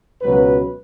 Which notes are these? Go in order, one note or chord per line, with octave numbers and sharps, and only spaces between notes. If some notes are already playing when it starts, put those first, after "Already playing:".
C#2 B2 F#3 B4